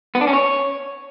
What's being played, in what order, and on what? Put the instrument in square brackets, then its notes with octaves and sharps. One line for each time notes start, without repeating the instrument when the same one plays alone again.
[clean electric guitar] B3
D4
C#4
C#5